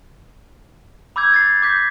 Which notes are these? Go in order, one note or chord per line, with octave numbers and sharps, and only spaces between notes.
B5 D6 E6 G6 G#6
G#6 A6 C7
D6 G6 B6